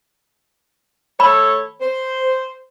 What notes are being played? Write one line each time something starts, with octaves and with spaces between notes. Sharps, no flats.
A3 A4 C#5 B5
C5